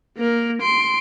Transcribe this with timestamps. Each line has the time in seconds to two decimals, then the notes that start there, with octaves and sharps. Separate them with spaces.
0.17 A#3 A#4
0.62 C6 D7